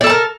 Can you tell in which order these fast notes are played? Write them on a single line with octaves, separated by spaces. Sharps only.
D5 A4 A5 A#4